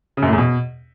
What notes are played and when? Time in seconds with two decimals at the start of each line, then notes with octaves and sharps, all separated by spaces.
0.17 C#3
0.22 F#2
0.28 A2
0.33 E2
0.38 B2